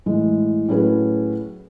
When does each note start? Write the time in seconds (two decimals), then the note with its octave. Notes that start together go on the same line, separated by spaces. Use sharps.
0.06 A2 E3 G#3
0.68 A2 F#3 C#4 G#4 B4